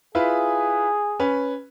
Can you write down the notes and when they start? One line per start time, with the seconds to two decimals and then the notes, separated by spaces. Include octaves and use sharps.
0.15 E4 F4 G#4 B4
1.20 C#4 B4